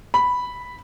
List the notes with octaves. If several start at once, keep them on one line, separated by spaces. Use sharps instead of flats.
B5